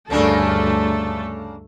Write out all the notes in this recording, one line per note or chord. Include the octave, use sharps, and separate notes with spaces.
D2 G2 C#3 A3 A#3 D4 A4